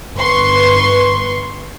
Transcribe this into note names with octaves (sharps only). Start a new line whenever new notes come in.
G1 B4 C6 C#6